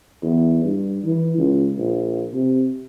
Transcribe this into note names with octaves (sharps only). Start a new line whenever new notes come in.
E2
G2
E3
C#2
A#1
C3